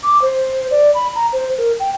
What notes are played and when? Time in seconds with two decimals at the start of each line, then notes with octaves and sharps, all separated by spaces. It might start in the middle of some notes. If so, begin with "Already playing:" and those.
0.03 D6
0.22 C5
0.71 D5
0.94 B5
1.15 A#5
1.33 C5
1.58 A#4
1.80 G5